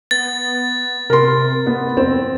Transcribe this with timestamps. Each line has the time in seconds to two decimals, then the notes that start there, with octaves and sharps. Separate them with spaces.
0.11 B3 A6
1.10 C3 A#4 C6
1.66 B3
1.97 F2 C4